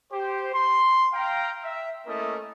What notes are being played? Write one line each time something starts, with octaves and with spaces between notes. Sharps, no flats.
G4 C5
C6
F5 G5 A#5
E5
A3 A#3 C#4 E4 A#4 D#5